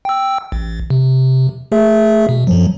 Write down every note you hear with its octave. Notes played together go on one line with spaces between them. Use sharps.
G5 E6
A1
C3
A3 G#4 E5
B2
F#2 F3 F#3